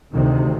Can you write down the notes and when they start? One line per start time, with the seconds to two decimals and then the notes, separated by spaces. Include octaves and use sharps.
0.13 D2 C3 D#3